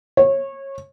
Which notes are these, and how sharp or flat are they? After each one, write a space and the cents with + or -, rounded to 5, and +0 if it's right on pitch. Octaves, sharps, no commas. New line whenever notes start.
C#5 -25